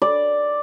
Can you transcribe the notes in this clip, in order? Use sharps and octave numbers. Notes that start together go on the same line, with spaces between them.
D5